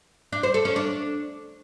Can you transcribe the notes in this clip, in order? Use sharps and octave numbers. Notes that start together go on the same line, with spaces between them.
D4
C5
A4
C#4
D4